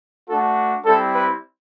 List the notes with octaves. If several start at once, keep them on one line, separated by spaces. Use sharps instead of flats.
A3 D4 F#4 A4
G3 C4 E4 A4
B4